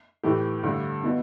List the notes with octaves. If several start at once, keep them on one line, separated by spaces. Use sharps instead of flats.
A2 E3 A3 G4
G2 D3 A3 D4
B2 B3 E4